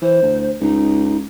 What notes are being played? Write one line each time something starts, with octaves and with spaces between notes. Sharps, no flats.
E3 C5
D2
C#2 D#4